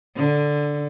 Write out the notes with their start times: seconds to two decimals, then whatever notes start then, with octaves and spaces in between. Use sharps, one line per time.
0.16 D3